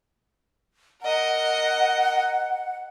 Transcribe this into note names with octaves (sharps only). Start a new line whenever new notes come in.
A#4 D#5 F#5